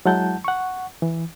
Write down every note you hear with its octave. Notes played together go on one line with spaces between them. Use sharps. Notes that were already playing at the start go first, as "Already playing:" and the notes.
F#3 G#3 E4 F#5 A5 G6
F#5 C#6
E3